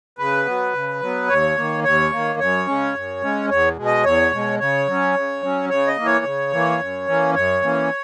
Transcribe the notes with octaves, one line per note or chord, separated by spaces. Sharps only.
C#3 B4
F#3 B3
C#3
F#3 B3
D#2 C#5
D#3 A#3
D#2 C#5
D#3 A#3
F#2 C#5
C#3 G#3 C#4
F#2
C#3 G#3 C#4
E2 C#5
B2 G#3
D#5
E2 C#5
B2 G#3
C#3 C#5
F#3 C#4
C#3
F#3 C#4
C#3 C#5
D#5
E3 A#3
C#5
C#3
E3 A#3
F#2
E3 A#3 C#4
F#2 C#5
E3 A#3 C#4